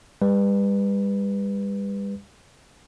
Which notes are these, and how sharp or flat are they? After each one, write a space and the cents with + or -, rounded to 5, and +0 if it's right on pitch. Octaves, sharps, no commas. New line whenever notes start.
G3 +35 B4 +0